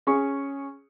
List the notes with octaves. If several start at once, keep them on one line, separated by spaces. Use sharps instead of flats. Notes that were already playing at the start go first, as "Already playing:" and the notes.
C#4 G#4 C#6